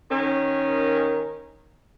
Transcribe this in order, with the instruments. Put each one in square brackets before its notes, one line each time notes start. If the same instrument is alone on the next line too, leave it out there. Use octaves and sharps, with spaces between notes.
[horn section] D#3 C#4